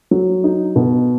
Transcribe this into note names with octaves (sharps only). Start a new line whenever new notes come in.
F#3
D#4
B2